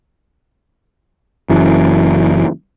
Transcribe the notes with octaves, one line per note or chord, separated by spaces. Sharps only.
F#1 F#2 E3